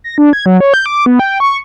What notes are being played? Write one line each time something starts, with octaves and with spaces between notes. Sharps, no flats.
A#6
D4
G#6
F#3
C#5
G6
D6
B3
G5
C#6